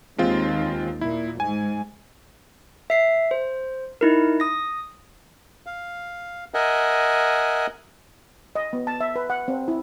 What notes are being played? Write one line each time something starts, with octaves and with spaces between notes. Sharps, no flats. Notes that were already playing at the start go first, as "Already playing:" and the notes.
D#2 G#3 C4 F4
A#2 E4
G#2 G#5
E5 C7
C5
D#4 E4 A#4
D#6 A#6
F5
A#4 D#5 E5 F#5 G#5
D#5
B3
A5
E5
B4
F#5
C4
E4